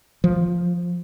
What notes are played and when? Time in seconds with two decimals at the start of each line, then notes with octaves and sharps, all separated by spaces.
0.24 F3